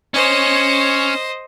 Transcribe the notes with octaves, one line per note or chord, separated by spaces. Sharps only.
C#4 C5 C#5 D#5